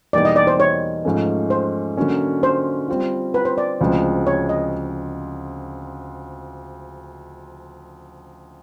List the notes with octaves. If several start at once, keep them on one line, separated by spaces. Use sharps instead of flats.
E2 B2 G3 A#3 D#4 D5
D#5
D5
C5
C#5
G#2 F3 A3 C#4
C5
D3 F#3 A#3 C#4
C5
G3 C4 F4
B4
C5
D5
D2 C#3 F3 G#3 C4
C#5
D#5